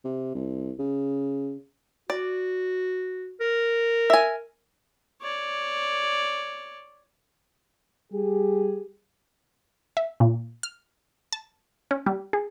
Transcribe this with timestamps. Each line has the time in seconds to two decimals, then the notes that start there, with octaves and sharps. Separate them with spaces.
0.04 C3
0.35 C2
0.79 C#3
2.10 F#4 D5
3.41 A#4
4.10 E5 G#5
5.22 C#5 D5
8.12 G3 G4 G#4
9.97 E5
10.20 A#2
10.63 F6
11.33 A5
11.91 C#4
12.06 G3
12.33 G#4